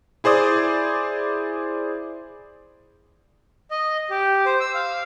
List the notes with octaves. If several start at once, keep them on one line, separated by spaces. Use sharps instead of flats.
E4 G#4 C5 D5 D#6
D#5
G4
C5
E6
F5